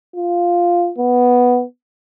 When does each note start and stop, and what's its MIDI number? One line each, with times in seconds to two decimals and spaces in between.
0.16 0.91 65
0.98 1.63 59